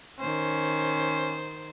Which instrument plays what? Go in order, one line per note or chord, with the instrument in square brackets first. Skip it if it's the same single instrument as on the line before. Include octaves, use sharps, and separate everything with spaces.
[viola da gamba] D#3 C5 [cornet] C#4